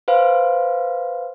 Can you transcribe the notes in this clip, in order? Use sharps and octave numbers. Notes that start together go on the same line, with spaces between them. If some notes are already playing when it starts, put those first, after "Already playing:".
B4 C5 F5